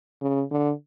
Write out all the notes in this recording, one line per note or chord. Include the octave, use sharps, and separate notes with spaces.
C#3
D3